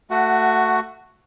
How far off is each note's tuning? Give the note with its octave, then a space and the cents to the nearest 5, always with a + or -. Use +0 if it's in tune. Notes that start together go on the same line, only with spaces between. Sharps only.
A3 +15 F#4 +0 F#5 +15